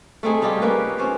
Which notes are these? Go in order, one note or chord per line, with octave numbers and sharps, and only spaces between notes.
A3 C4 D#4 G#4
G3 D#4 F4 G4
A#3 C#4 B4
C#4 C5